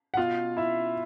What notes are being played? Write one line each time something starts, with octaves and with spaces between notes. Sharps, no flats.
F#5
B2 F4 F5
E4 E5